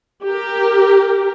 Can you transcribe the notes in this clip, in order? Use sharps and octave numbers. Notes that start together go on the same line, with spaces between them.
G4 A#4